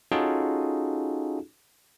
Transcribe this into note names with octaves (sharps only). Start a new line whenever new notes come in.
C#4 D#4 F4 F#4 G#4 A4